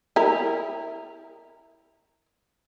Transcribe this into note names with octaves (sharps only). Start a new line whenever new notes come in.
E4 A#4